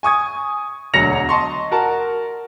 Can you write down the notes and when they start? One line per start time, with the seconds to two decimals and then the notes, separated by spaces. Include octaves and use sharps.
0.03 G#5 C#6 D#6 G#6
0.94 E1 D2 F#3 A#6 C#7 F7
1.29 D#5 A5 C6 C#6
1.71 F#4 A#4 A5